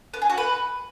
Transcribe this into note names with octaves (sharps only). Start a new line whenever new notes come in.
B3
G#4
F#4
B4